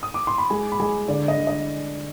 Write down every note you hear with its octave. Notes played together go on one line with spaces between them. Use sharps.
D#6
D6
C6
B5
G#3 G#5
B5
G#3 G#5
D3 D5
D#5
D3
D#5